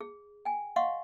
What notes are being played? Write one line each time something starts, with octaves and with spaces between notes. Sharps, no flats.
G#4
G5 G#5
D#5 F5 F#5 C6 C#6